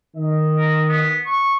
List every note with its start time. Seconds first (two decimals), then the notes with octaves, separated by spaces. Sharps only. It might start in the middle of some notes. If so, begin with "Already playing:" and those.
0.16 D#3 D#5
0.58 A#4
0.89 B3
1.26 C#6